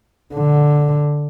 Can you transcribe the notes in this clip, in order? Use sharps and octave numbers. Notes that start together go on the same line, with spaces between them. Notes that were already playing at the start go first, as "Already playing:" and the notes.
D3